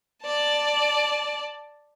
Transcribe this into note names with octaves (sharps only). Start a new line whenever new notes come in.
D5 A5